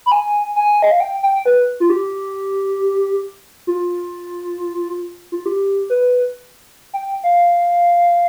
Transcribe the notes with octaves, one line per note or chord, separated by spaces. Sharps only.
B5
G#5
G#5
D#5
F5
G5
G5
B4
F4
G4
F4
F4
G4
B4
G5
F5